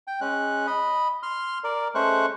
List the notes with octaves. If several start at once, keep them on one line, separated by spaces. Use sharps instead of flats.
G5
G#3 C#4 F#6
D#5 B5
C6 F6
A#4 D5
G#3 A3 C#4 C5 C#6 F#6